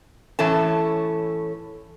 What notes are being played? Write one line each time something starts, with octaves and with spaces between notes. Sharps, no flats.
A2 E3 C#4 A4 A5